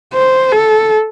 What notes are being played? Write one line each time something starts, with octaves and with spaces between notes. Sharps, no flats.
C5
A4